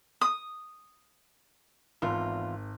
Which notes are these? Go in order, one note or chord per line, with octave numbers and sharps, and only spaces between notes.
D#6
G#1 E2 F4